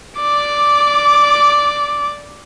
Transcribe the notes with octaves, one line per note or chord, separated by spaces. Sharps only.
D5 D6